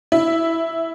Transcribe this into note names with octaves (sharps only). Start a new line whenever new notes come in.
E4